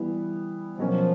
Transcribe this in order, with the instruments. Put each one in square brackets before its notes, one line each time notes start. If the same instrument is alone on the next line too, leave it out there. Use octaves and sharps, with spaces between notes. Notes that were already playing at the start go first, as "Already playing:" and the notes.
Already playing: [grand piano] E3 G3 B3 E4
[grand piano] B2 F#3 A#3 C#4 [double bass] F3